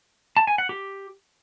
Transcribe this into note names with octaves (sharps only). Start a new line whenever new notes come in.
A5
G#5
F#5
G4